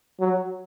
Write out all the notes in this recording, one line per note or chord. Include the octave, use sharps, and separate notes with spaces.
F#3